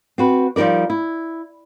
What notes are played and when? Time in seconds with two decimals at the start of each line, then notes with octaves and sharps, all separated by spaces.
0.18 C4 F#4 B4
0.56 F3 G3 D#4 A#4 D5
0.90 E4